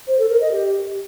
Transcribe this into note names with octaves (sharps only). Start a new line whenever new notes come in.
C5
A4
A#4
D#5
G4